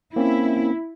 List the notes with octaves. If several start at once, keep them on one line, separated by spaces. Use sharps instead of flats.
A#3 C4 C#4 E4